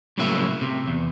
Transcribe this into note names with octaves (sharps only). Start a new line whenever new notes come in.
C2 A2 C#3 F#3 A#3 E5
C3
E2